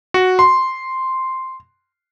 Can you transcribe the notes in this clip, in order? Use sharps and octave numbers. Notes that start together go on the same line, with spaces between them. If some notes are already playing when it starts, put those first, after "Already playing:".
F#4
C6